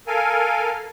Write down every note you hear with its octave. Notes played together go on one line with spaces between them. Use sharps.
A4 A#4 F5 G#5